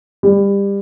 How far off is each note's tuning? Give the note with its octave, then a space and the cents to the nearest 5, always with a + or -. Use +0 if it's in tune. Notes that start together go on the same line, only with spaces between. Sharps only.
G3 +25